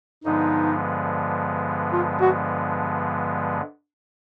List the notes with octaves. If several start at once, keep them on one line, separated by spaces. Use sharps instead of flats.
G2 D3 F3 G#3 B3 D#4
F4
F#4